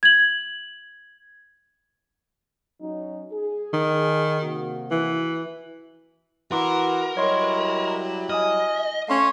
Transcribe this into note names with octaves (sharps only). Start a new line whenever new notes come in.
G#6 F#7
F#3 C#4 D#4
G#4
D#3
C3 A#3 F#4
E3
E3 E4 F#4 A#4 C6 D6
F#3 G3 E4 C#5 D#5 C6
D#5 G#5 D#6 F6
A3 C#4 F5 C6 C#6